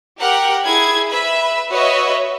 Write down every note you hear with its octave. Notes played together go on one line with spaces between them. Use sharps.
G4 A#4 F#5 G5
E4 G#4 G#6
B4 E5 B5
F#4 B4 C#5 D#5 E5